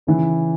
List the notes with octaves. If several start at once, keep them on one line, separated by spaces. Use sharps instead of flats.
C#3 E3